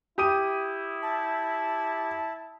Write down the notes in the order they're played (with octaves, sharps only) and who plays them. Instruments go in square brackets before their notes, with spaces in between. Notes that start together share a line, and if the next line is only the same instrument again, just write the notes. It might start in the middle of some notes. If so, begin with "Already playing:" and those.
[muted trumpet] E4 [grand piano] G4 D#6 D#7
[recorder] A5